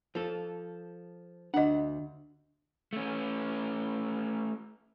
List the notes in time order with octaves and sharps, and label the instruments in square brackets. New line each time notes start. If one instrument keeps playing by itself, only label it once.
[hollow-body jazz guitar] F3 A4
[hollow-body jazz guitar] D2 F#5 [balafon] D4 D#5
[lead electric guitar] A3 C#4